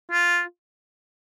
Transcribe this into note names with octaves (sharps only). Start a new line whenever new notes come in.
F4